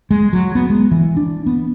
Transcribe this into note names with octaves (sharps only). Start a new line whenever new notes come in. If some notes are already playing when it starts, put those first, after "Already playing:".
G#3
F#3
B3
G#3
E3
D4
B3